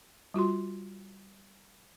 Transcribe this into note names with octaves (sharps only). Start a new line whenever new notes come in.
G3 F4 F#4 C6